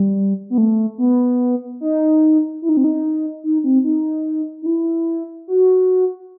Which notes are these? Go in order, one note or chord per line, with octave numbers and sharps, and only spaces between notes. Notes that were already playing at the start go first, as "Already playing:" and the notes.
Already playing: G3
B3
A3
B3
D#4
E4
D#4
C4
D#4
D#4
C4
D#4
D#4
E4
F#4